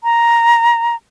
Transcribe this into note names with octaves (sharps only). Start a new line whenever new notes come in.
A#5